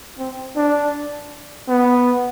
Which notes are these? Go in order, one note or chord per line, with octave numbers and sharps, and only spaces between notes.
C4
D4
B3